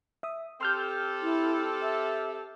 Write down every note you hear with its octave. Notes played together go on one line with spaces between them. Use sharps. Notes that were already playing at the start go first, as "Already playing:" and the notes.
E5 D#6
C4 G4 A4 C6 F6 G6
E4
E5